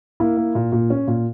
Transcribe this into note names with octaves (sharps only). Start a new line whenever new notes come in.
A#3 E4
A#3
A#2
A#2
C#4
A#2